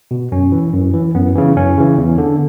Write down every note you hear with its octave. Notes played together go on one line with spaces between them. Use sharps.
B2
F#2 C#4
E3
F#2
E3
F#2 B3
C#3 E3
F#2 C#4
C#3 E3
E2
D3